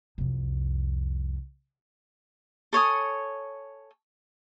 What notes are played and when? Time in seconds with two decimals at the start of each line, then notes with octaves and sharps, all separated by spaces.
0.18 C2 F2
2.73 A4 C#5 G#5 D#6